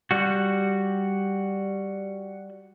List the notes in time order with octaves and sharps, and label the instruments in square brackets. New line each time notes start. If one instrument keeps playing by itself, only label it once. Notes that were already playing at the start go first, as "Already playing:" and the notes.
[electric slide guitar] G3 F#4